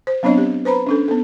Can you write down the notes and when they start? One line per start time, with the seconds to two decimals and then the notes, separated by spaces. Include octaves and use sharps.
0.07 C5
0.23 F#3 B3 C4 D4 C#5 D#5
0.38 G4
0.65 B4 C5 A#5 B5
0.86 C#4 D4 A4
1.08 B3 A4